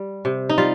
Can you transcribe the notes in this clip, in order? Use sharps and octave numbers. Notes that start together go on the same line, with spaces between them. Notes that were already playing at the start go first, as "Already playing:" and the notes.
Already playing: G3
C3
D#4
G3 F4